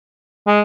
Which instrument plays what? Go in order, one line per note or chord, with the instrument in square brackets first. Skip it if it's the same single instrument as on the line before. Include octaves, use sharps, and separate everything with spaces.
[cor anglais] G#3